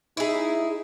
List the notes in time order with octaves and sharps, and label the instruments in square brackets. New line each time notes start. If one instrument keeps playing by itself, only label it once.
[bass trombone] D#4 [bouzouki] E4 G#4